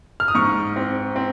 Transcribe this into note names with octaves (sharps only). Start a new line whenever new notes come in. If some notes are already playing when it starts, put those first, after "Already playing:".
F6
D#6
G#2 C#6
C4
C4